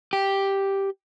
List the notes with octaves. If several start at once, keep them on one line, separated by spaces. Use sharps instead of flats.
G4